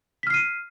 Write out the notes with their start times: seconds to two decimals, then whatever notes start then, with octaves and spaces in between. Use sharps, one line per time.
0.23 B6
0.27 F6
0.30 C7
0.34 D#7